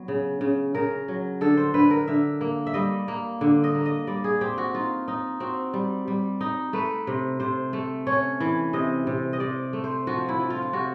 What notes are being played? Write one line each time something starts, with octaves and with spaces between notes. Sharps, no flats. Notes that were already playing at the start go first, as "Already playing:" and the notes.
Already playing: F#3 B3
C#3
C#3
C#3 A#4
F#3
D3 A4
C5
D3 B4
A#4
D3 E5
A#3
E5
G3 D#5
A#3
D3
D#5
A#3
D#5
G3 D5
G#4
C4 G4
F#4
D#4 F4
D#4
C4 F#4
G3
G3
D#4
A3 B4
C3
C3 C5
A3
C#4 C#5
E3
C3 D#5
C3
D#5
C3 D5
A3
C5
F3 F#4
E4
F3
F4
F4
C3 F#4